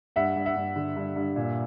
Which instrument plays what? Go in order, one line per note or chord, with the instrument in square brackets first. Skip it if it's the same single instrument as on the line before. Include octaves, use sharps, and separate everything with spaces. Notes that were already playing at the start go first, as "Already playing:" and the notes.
[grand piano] G2 E5 F#5
G2
E5 F#5
G2
D3
G2
G2
A#2